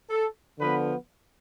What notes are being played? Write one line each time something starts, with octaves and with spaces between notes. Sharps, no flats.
A4
D3 F3 B3 B4